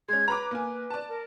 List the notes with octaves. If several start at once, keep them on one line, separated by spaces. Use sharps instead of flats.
G#3 C#4 G#6
B4 A#5 B5 D6
A#3 G#5
D5 A5
A#4